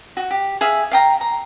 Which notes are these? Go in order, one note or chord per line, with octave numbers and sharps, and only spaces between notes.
F#4
G4
G#4 E5 F5
F5 G5 A#5
A#5